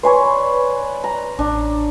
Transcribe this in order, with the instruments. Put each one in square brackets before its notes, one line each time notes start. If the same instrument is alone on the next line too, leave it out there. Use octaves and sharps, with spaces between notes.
[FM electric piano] B4 D5 B5 [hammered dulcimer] C#5 G#5 C6
[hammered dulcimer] A#5
[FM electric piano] A1 [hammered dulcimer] D4